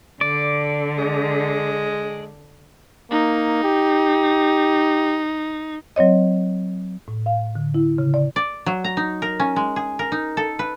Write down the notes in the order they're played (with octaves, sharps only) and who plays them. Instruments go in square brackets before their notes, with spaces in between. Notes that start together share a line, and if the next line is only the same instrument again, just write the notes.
[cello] D3 [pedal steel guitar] D5
[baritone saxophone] G#3
[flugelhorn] A#3 [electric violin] D#4
[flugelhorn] G4
[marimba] F#3 C4 C#5 D#5
A2
F5
D3
E4
C#3
D5
[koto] D5
F#3
A#5
D#4
A#4
C#4
G#3
G#4
A#4
D#4
A4
B4